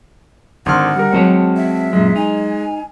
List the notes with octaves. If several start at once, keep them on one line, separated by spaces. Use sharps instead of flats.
G#1 D3 F#5 C6 F6
G3 A#4
F#3 G#3 C4 F#4 C#5 A5 C#7
E5
F#2 A#2 G#3
D#4 G#5